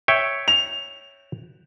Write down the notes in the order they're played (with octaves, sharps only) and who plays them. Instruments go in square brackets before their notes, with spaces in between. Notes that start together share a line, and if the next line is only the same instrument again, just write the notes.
[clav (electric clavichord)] C#5 E5 G5
[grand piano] F7